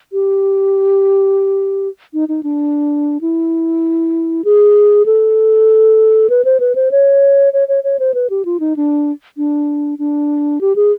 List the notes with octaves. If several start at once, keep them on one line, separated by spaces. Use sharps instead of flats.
G4
D#4
D#4
D4
E4
G#4
A4
B4
C5
B4
C5
C#5
C#5
C#5
C#5
C5
B4
G4
F4
D#4
D4
D4
D4
G4
G#4